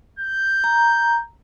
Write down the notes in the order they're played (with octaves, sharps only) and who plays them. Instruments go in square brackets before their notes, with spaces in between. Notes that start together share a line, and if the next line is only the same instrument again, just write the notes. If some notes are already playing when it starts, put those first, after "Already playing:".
[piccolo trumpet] G6
[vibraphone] A#5